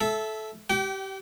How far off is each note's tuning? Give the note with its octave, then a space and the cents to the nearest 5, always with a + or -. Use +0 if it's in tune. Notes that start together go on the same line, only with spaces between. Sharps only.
A4 -20 E5 +0
G4 -20 G5 -40